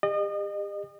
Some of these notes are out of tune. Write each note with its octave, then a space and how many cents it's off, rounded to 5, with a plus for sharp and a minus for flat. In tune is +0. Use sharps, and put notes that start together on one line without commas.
G4 +40 D#5 -35